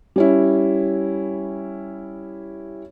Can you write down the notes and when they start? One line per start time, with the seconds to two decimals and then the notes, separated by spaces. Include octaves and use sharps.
0.16 G3 C#4 E4